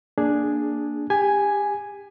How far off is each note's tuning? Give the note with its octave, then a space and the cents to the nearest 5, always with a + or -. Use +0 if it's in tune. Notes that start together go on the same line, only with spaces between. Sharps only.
A#3 +0 D4 +0 G#4 +0
G4 +25 G#5 +0